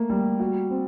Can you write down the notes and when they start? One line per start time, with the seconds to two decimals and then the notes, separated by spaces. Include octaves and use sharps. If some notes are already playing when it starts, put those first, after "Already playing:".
Already playing: A3 A#3
0.10 G3
0.40 F#4
0.71 C4